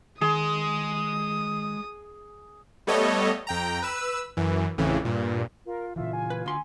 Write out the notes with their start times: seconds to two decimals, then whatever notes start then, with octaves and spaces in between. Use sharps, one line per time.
0.21 D#3 G#3 G#4 C6 D#6
2.87 G3 A3 B3 A4 C#5 D#5
3.47 F2 G5 A#5
3.82 B4 E6
4.37 F#2 E3
4.78 A1 F2 A2 C#3 E3
5.05 G2 A#2
5.66 F4 A#4
5.96 A#2 C#3 E3 F4 E5
6.13 G#5
6.30 B4
6.46 D2 C6